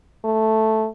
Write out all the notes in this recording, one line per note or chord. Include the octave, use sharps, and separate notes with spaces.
A3